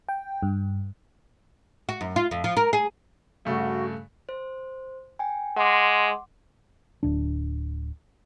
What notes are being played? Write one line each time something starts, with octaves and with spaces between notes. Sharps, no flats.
G5
G2
F#4
F#2
F4
F2
F3
A#4
G#4
G2 C#3 A3 F#4
C5
G5 G#5
G#3 F#5 C6 D6
D1 D4